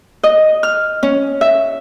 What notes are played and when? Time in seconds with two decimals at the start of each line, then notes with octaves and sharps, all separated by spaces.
0.23 D#5
0.63 F6
1.03 C#4
1.41 E5